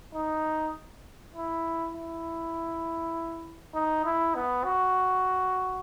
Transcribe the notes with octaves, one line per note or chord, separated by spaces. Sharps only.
D#4
E4
E4
D#4
E4
B3
F#4